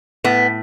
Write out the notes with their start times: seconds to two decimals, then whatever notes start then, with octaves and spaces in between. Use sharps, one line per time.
0.24 A2 B3